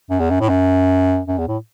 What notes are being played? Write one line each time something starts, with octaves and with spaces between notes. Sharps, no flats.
F#2
E2
F#2
A2
F#2
F#2
E2
A2